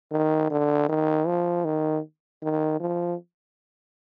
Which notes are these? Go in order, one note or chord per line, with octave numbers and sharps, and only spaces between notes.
D#3
D3
D#3
F3
D#3
D#3
F3